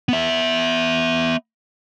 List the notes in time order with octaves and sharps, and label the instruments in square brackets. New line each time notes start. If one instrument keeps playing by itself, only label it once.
[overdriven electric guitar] B3 E5